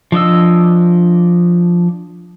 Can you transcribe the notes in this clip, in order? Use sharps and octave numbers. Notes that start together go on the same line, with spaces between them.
F3 D4 D#5 E6